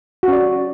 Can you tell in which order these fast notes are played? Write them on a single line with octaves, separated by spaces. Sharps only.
F#4 C#4 D5